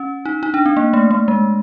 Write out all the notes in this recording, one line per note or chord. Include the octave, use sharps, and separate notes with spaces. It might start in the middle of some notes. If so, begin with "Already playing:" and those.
Already playing: C#4
D#4
D#4
D4
C4
A#3
A3
A3
G#3